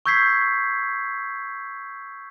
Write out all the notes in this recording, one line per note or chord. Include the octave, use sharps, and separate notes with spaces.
C#6 E6 G6 G#6 B6 C7